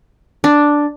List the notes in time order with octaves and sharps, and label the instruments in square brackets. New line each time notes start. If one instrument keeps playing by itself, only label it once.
[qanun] D4